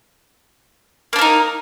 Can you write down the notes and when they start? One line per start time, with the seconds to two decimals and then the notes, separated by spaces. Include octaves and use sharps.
1.13 A#3
1.16 D4
1.19 A#4
1.21 D#4